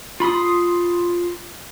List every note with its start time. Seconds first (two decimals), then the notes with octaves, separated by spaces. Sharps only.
0.20 F4 B5 C6 D#6